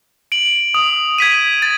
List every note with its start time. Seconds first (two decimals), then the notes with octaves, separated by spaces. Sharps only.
0.32 D7 F#7
0.74 D#6
1.18 G#6 B6 D#7
1.62 A6